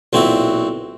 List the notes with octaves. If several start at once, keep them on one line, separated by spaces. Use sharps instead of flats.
B1 A#2 C4 E4 F#4 F#5